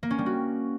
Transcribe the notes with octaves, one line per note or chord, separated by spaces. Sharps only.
A#3
C#4
G3
F#4